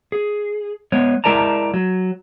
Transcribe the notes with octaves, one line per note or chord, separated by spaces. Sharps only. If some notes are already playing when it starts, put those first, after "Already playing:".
G#4
G#3 B3 C#5
G#3 E4 A#4 D5 A5 A#5
F#3